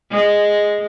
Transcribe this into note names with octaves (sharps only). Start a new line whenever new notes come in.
G#3